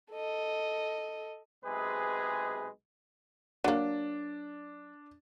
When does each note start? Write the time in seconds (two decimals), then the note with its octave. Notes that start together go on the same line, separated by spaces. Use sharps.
0.12 A4 D#5
1.65 B1 C3 G#3 G#4 B4
3.64 F#3 A#3 D4